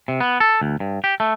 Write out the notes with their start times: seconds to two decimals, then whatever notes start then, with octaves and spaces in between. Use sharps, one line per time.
0.08 C3
0.20 B3
0.40 A4
0.61 D2
0.80 G2
1.04 G4
1.20 A3